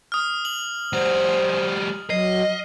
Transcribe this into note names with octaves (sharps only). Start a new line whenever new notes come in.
D#6 F6
F#7
G3 F#4 C5
F#3 D#5 C7